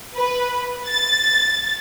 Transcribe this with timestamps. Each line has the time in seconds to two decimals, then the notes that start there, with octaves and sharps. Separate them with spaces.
0.16 B4
0.88 A6